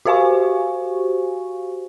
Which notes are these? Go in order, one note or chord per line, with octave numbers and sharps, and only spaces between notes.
F#4 G4 C5 F5 G#5 C#6